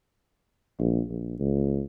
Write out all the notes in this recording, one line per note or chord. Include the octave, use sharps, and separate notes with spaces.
A#1
A#1
C#2